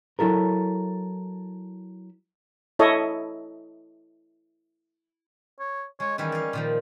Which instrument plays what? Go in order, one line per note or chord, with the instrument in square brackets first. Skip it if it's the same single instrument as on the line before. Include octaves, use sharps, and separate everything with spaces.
[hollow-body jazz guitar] F#3 E4 A4 A#4
[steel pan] E4 A4 C#5 D#5
[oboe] C#5
[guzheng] G#3 [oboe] C#5
[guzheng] D#3 E3 G3 [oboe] C#4
[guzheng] D5 F5
A#2 D#3 F3